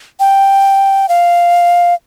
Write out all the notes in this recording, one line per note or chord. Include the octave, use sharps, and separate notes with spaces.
G5
F5